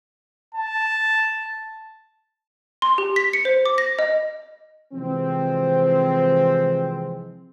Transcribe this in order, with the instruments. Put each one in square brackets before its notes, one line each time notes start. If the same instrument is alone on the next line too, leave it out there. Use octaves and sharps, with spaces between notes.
[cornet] A5
[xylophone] C6
G4
B6
C#7
C5
D6
A#6
D#5
[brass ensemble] C3 E3 F3 G#3 C4